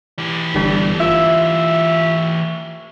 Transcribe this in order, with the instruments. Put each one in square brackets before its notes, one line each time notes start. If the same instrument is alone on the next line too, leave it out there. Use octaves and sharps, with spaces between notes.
[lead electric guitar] E3 G4
[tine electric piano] G1 G2 G3
[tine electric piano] F4 [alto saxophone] E5